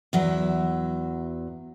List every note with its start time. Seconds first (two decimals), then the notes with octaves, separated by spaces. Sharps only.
0.13 E2 F#3 E5